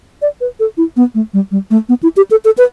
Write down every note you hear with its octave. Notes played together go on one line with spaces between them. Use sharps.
D5
B4
A4
E4
B3
A3
G3
G3
A3
B3
E4
G4
A4
A4
B4